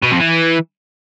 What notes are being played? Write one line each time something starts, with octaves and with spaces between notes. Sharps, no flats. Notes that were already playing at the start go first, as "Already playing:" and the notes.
B2
F2
E3